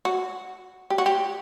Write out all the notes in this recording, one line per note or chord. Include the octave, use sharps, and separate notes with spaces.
F#4
G4
F#4
G4